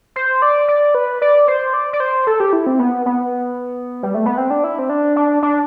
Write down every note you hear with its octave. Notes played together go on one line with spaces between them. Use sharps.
C5
D5
D5
B4
D5
C5
D5
D5
C5
A4
G4
E4
C4
B3
B3
G3
A3
B3
C4
D4
E4
C4
D4
D4
D4